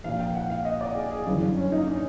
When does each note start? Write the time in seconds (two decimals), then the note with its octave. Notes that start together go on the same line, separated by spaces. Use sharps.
0.04 A#1 A#2 F5
0.20 G5
0.35 F#5
0.50 F5
0.65 D#5
0.81 D5
0.95 G#4
1.11 G#4
1.26 G1 F#2 C#3 E3
1.41 D4
1.57 C#4
1.72 D#4
1.87 D4